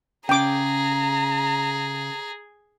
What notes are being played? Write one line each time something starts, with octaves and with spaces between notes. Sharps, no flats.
C#3 G#4 G5 A#5 D6